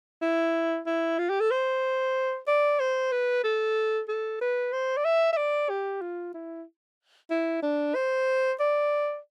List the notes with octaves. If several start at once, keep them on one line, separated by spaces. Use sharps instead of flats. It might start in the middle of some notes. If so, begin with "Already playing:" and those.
E4
E4
F4
G4
A4
C5
D5
C5
B4
A4
A4
B4
C5
D5
E5
E5
D5
G4
F4
E4
E4
D4
C5
D5